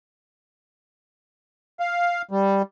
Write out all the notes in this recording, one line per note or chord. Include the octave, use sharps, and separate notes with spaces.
F5
G3